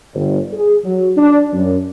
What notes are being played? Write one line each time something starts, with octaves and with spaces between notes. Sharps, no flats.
G1
G#4
F#3
D4
F#2